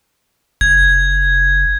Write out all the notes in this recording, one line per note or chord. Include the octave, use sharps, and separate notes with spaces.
F#1 G#6